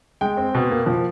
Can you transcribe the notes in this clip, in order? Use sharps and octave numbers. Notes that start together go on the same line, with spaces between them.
G#3 G5
C4
B2
A#3
F3